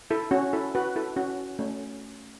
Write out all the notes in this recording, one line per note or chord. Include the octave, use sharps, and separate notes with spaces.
E4 A4
C#4 F#4
E4 A4
F#4 B4
E4 A4
C#4 F#4
A3 C#4